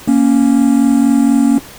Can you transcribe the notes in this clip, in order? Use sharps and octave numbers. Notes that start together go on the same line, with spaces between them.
A#3 C#4